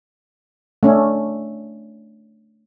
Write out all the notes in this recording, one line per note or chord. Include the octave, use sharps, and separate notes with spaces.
A3 C#4 D4